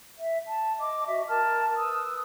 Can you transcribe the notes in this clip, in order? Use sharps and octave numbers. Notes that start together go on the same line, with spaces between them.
E5
A5
D#5 D6
F#4 D#5 E5
A#4 A5 F6
B4 D#6 E6